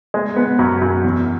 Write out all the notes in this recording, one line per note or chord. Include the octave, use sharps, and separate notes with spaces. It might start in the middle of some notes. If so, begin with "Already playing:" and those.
G#3
B3
F#2
F#2
E2